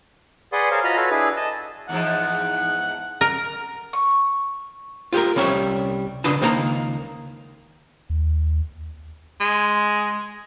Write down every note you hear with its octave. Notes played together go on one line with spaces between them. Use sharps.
G#4 B4 D5 F#5 C6 D#6
G#4 A#4 C5 C#5 F5
F4 F#4 D#5 A#5 B5 F6
F#4 A4 B4 C#5
D4 E4 G#4 B4
D#5 A5
E2 G#2 F3 F#5
A#4
C#6
F4 G4 G#4 A#4
C2 G3 C#4 C#5 E5
B1 C#3 D4 B4 D#5 A5
C#2 D#3 A#3 A#4 A5 A#5
D#2
G#3